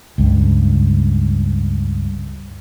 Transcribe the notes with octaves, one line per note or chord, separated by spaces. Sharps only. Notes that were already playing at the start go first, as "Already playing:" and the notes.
C#2 G2